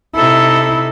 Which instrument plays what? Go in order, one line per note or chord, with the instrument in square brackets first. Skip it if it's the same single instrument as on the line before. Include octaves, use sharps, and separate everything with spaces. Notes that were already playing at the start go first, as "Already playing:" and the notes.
[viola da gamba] C3 D#4 A4 [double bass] E4